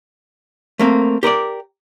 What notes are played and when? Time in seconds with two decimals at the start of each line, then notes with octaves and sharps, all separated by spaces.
0.79 A3 A#3 C4
1.23 G4 A#4 B4 D5